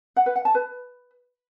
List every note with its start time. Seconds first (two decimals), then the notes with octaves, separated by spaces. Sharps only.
0.16 F#5
0.26 B4
0.36 F#5
0.45 A5
0.55 B4